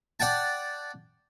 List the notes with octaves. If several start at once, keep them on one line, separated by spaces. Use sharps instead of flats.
D5 F#5 G5 A5